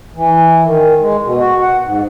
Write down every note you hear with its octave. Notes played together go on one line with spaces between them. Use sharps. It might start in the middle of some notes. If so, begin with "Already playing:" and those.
E3
D#3
G#3
B2
F#4
F#5
G#2